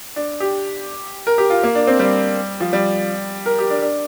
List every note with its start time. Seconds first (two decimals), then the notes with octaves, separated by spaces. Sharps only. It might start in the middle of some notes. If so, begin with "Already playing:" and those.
0.16 D4
0.40 G4
1.27 A#4
1.38 G4
1.50 F4
1.63 A#3
1.75 D4
1.87 C4
1.99 G3
2.60 F3
2.73 G3
3.46 A#4
3.59 G4
3.70 D4
3.82 D4